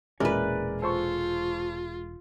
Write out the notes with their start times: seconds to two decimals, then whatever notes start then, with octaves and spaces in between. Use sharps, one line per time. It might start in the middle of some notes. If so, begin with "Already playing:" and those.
0.20 E1 A#2 G#3 C#4 E4 A#4 B4 D5
0.82 F4 A4 C5 C#6